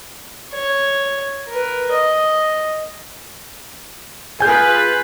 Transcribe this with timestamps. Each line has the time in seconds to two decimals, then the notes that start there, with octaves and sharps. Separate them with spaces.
0.52 C#5
1.48 A#4 B4
1.91 D#5
4.40 F4 G#4 B4 G#5 G6